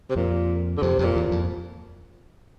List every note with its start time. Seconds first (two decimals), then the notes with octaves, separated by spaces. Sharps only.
0.10 C3
0.15 F2 A#2
0.77 D3
0.82 F2 C3
0.98 F2 C3
1.05 A#2
1.16 E2
1.26 A#2
1.31 F2